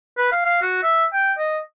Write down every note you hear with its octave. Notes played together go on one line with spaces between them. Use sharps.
B4
F5
F5
F#4
E5
G5
D#5